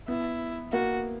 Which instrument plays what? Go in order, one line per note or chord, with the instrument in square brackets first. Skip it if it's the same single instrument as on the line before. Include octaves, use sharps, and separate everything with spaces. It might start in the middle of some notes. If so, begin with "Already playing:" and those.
[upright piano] B3 [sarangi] E4
[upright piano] A#3 [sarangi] F#4